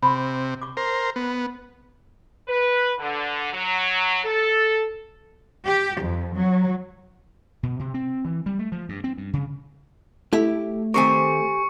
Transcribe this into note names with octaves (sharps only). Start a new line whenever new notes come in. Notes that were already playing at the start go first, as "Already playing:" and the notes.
C3 B5 C6
C#6 D6
A#4 C5
B3
B4
D3
F#3
A4
G4
F2
F#3
B2
C3
C4
E3
G3
A3
F3
G2
C4
G2
C#3
A3 E4 G4 E5
D#3 C4 G4 A#4 C5 G#5 C#6 C#7